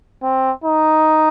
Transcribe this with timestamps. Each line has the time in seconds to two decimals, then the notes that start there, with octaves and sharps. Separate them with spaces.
0.23 C4
0.64 D#4